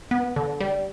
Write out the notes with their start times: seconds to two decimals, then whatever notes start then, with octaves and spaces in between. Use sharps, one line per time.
0.11 B3
0.36 D3
0.60 G3